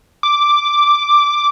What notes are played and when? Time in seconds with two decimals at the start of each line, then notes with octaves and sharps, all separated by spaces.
0.23 D6